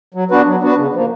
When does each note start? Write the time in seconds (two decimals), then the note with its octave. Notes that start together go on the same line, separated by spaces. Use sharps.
0.14 F#3
0.31 B3 D4 F#4 B4
0.46 F#3
0.62 B3 D4 F#4 B4
0.77 C#3
0.93 F3 A#3